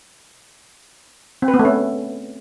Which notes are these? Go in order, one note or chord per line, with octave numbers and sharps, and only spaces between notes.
C4
B4
B3
A3
C#4